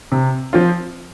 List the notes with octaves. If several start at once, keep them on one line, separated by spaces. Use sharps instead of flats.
C3
F3 C4 F4